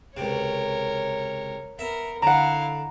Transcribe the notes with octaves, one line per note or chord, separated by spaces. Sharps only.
C#2 C3 A#4 C#5
B3 A#4 E5
D3 E4 F5 F#5 A#5